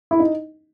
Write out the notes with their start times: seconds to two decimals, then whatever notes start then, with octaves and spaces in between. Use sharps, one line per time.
0.11 E4
0.20 D#4